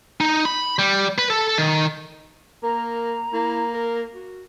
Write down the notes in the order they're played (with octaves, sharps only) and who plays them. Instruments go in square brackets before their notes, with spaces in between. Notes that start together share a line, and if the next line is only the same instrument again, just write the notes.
[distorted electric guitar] D#4
B5
G3
B4
A4
D#3
[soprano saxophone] A#3 [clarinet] A#4 [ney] A#5
[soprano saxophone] A#3 [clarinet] E4
[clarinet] A#4
F#4